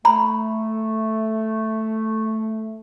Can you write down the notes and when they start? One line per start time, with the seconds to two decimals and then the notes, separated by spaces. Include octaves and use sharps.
0.05 A3 A#5 B5